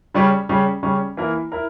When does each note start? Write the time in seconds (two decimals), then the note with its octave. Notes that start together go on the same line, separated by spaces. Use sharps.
0.14 C#3 G3 C#4
0.49 C#3 G3 C#4
0.83 C#3 G3 C#4
1.17 E3 A#3 E4 A#4
1.52 E4 A#4